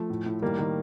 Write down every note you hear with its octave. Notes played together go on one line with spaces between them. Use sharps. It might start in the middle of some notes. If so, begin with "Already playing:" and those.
Already playing: F3 A3
A2
A2
D#3 G3 A#3
D#3